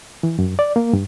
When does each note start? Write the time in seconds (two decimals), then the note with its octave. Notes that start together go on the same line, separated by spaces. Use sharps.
0.23 E3
0.39 F#2
0.59 D5
0.76 A#3
0.93 G2